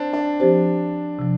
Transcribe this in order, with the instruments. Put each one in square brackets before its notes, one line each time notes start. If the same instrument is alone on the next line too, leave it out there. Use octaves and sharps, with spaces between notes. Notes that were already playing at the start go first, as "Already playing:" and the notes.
Already playing: [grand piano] C4 D4
D4
[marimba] F3 C4 G4 C5
C3 F3